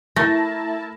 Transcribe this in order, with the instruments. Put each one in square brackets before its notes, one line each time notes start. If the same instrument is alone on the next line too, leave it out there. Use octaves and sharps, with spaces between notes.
[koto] A3 [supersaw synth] E4 A5 [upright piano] A#4 A#6